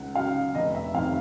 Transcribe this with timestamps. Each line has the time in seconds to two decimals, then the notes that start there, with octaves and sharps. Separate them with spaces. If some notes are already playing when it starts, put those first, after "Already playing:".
Already playing: C#2 F#5
0.15 C#3 F#3 F5
0.55 F1 D#5
0.75 E5
0.94 F2 C3 D#3 F5